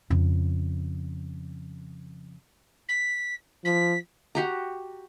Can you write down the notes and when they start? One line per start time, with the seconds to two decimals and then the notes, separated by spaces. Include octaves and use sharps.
0.10 F2 C#3
2.88 B6
3.65 F3 B6
4.35 F#4 G4 A#5